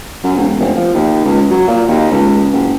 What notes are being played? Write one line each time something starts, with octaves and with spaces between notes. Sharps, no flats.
F#2
E1
F1
F3
D#2
C#2
F#3
A#2
D#2
C#2
F#1